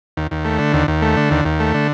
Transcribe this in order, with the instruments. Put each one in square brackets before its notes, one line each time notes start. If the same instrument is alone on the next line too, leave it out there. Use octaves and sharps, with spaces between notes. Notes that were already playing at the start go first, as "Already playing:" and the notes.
[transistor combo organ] D#2
D#2
A3
D3
D#2
D#2
A3
D3
D#2
D#2
A3
D3